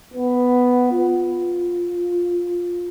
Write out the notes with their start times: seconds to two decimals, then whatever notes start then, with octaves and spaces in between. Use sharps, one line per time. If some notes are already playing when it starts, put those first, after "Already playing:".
0.14 B3
0.92 F4